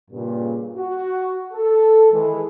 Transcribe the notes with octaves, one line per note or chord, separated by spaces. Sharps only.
G2 A#2 C#3
F#4
A4
D#3 E3 G#3